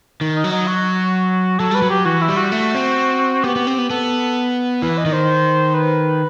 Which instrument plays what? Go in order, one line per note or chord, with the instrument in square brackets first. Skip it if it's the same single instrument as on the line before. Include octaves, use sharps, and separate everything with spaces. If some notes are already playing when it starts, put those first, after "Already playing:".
[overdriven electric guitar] D#3
[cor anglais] D#4
[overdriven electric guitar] F#3
[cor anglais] D#4
F#4
[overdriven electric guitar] F#3 [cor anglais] A4
[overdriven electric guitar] G3 [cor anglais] B4
[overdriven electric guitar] F#3
[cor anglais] G4
[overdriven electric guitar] E3 [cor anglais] F#4
[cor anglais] E4
[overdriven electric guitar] G3
[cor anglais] F#4
[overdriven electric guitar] A3
C4
[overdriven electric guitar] B3 [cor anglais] G4
[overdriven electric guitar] B3
C4
B3
[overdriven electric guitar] B3 [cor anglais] A4
[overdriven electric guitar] E3 [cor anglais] B4
[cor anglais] D#5
[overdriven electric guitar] D#3
[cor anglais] C5
B4